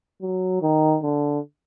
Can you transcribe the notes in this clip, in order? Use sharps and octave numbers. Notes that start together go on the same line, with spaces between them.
F#3
D#3
D3